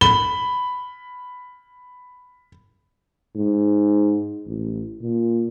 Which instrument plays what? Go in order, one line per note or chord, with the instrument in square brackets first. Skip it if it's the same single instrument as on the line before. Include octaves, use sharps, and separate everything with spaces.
[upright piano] B5 G7
[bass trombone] G#2
A1
A#2